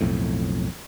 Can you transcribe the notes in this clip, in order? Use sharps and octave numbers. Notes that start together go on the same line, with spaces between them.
B1 F2 A2